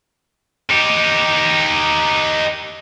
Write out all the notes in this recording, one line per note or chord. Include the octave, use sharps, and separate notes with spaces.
D#4 G4